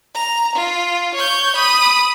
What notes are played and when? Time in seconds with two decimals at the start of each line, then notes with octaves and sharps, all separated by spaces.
0.14 A#5
0.55 F4
1.14 C#5 G6
1.56 B5 D#6